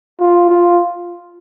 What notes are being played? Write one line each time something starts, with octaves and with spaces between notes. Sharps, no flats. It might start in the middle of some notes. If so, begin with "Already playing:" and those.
F4
F4